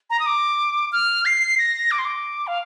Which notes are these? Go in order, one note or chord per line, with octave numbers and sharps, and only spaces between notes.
A#5
D#6
D6
F6
C7
A#6
D6
C6
D6
F5